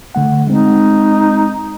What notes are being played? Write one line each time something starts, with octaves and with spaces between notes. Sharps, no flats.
D3 A3 F#5
G#3 C4 D#4